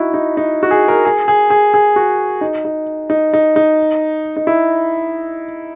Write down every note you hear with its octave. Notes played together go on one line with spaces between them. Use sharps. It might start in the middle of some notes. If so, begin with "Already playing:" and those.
Already playing: D#4 E4 F#4
D#4
D#4
F#4
G#4
A#4
G#4
G#4
G#4
G#4
F#4
D#4
D#4
D#4
D#4
D#4
D#4
E4